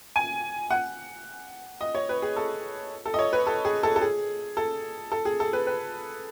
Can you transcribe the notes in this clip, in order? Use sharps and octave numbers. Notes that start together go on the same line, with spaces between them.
G#5
F#5
D#5
C#5
B4
G#4
A4
A4
D#5
C#5
B4
A4
G#4
A4
A4
G#4
A4
A4
G#4
A4
B4
B4